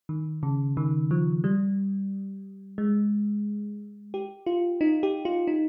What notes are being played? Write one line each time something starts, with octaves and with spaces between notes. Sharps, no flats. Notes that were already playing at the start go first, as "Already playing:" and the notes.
D#3
C#3
D#3
F3
G3
G#3
G4
F4
D#4
G4
F4
D#4